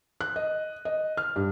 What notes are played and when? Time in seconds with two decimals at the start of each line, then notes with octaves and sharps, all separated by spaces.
0.21 F#6
0.36 D#5
0.85 D#5
1.17 F6
1.36 G2